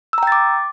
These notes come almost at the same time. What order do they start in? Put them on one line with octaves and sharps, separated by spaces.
E6 A#5 G5 A6 D6